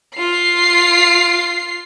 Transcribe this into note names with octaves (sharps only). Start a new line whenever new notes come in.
F4 C7